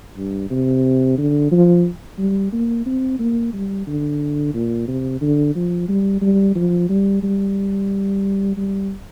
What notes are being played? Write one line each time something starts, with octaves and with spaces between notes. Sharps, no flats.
G2
C3
D3
F3
G3
A#3
C4
A#3
G3
D3
A#2
C3
D3
F3
G3
G3
F3
G3
G3
G3